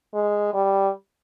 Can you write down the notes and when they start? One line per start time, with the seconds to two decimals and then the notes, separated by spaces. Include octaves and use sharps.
0.14 G#3
0.54 G3